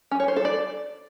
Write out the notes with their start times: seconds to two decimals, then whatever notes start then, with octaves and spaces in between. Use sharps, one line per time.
0.11 C#4
0.20 C#5
0.28 C5
0.36 A4
0.45 D5